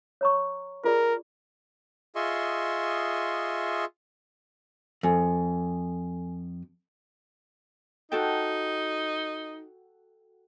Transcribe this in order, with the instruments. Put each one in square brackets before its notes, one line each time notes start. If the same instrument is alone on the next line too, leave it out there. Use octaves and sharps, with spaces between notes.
[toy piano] C#5 A#5 C#6
[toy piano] F4 G#4 D5 [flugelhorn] A#4
[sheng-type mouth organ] F4 G#4 D#5 E5 C6 C#6
[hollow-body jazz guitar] F2 [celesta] A4 G#5
[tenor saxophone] D#4 [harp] F#4 A4 G5